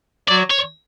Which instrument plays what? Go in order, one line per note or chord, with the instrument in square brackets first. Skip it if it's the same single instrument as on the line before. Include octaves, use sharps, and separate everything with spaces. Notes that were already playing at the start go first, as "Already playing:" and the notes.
[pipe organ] F#3 F#4 [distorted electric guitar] D5
[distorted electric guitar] C#5